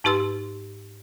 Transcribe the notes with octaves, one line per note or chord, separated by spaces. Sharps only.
G#2 D#4 G4 B4 C6 E6